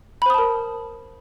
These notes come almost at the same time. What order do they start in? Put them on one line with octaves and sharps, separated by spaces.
B5 C5 D#6 A5 A#4